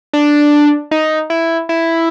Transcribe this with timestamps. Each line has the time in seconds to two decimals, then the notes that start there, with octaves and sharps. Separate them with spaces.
0.13 D4
0.91 D#4
1.30 E4
1.69 E4